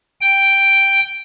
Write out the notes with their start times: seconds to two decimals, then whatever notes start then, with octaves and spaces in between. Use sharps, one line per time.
0.21 G5